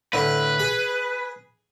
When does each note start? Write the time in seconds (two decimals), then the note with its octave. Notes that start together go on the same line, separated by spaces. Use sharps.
0.13 A2 D3 B4
0.59 G#4